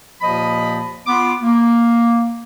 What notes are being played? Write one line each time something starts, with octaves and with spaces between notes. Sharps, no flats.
D#2 A#2 F3 D#5 B5
B3 F4 D6
A#3